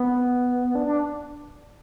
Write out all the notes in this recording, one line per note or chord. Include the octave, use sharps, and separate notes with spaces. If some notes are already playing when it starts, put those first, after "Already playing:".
Already playing: B3
D4
D4